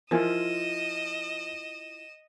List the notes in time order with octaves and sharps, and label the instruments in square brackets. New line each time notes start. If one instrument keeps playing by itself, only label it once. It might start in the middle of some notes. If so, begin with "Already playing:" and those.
[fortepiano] F3 [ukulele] D4 E4 F4 [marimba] A#4 G#5 [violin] D#5 E7